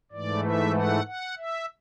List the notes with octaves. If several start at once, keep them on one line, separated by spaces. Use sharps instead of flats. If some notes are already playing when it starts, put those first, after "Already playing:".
G#2 E3 A3 D5
E5
F#5
F#5
E5